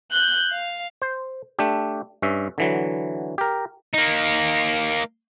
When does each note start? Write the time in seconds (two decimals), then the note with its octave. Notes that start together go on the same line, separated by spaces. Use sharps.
0.11 F#6 G6
0.52 F5
1.02 C5
1.59 A3 D4 G4
2.22 G2 C#4 E5
2.58 D3 E3 F#3
3.38 G4 A#4
3.93 A#3 D#4